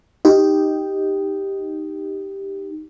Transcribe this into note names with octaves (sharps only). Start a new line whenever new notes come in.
D#4 G4